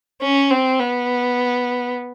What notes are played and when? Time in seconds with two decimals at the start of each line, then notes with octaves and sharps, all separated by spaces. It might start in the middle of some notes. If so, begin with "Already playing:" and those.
0.22 C#4
0.51 C4
0.79 B3